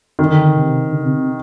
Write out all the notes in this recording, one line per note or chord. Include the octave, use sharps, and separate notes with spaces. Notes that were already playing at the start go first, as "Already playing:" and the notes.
D3 D#3
C3
D3
C3
C3